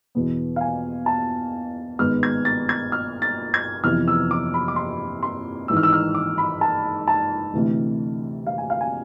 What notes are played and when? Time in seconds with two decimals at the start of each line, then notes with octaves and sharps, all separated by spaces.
0.15 E2 B2 B3
0.56 F5
0.61 G#5
1.06 A5
1.99 G#1 G#2 G#3 B3 F6
2.23 G#6
2.45 A6
2.69 G#6
2.92 F6
3.22 A6
3.54 G#6
3.84 F2 C3 E3 B3 F6
4.08 E6
4.31 D6
4.54 B5
4.68 D6
4.76 C6
5.23 C6
5.68 G#1 G#2 E3 E6
5.77 F6
5.83 E6
5.93 F6
6.15 D6
6.38 B5
6.61 A5
7.08 A5
7.53 D2 C3 E3 A3
8.47 F5
8.58 G#5
8.70 F5
8.81 G#5